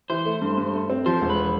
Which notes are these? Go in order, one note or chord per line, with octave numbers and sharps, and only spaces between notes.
E3 C5
A3
G2
G2
A3
C4
F3 C5
E1
B4